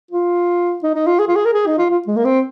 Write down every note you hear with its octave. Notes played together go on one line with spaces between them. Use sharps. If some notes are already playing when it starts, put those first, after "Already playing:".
F4
D#4
D#4
F4
G#4
F4
G#4
A#4
G#4
D#4
F4
F4
G#3
A#3
C4